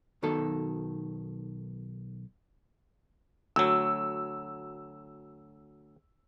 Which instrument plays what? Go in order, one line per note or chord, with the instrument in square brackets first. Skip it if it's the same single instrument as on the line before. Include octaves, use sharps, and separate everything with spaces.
[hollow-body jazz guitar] B1 B2 D#3 A4
[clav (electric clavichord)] D2 F#3 [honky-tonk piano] E6